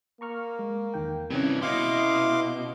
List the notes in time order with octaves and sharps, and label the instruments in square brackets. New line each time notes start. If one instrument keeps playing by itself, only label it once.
[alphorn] A#3 [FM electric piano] A#5 C#6 F6
[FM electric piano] G#3
E2 D#3 G5
[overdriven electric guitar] G2 E3 [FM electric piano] C3 C#4
[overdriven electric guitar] B2 [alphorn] E4 [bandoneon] F5 C6 D6